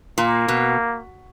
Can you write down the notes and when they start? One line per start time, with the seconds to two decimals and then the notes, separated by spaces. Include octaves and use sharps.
0.18 A#2 A#3
0.48 B2